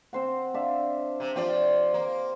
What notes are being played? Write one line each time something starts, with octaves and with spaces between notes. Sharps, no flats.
C4 C5 F#5
D4 E5 F5
C3
F3 F4 G4 C5 D5 G5
A#3